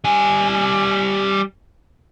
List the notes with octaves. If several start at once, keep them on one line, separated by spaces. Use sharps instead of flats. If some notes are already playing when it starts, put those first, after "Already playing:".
G3 G#5